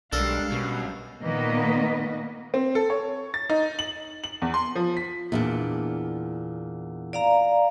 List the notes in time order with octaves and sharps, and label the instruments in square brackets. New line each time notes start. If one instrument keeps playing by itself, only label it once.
[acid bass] B1 [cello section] G3 G#3 F5 [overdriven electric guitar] D4 [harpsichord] A4 A#4
[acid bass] B2 [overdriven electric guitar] F#3 C#4
[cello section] A#2 D#3 A#3 B3 B4 D#5
[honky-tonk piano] C4
A4
C#5
A6
D#4
F#7
F#7
E2
C6
F3
B6
[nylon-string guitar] E2 A#2 D4
[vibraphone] D5 F5 A#5